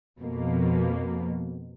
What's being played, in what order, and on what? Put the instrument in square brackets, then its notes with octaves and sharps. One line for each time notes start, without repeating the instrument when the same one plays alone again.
[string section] F2 B2 A#3